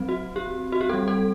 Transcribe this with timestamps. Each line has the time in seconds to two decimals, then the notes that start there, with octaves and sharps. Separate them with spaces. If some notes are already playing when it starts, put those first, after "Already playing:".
Already playing: F#3 C4
0.09 F#4
0.36 G4
0.72 F#4
0.81 G4
0.89 G3 C4 A4
1.08 A4